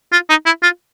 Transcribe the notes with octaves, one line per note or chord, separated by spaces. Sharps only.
F4
D#4
E4
F4